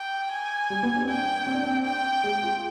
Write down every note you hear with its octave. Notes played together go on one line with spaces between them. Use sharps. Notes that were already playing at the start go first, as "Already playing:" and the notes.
Already playing: G5
G#5
G3
B3
D4
C4
D4 G5
C4
D4
C4
G5
G#3
F4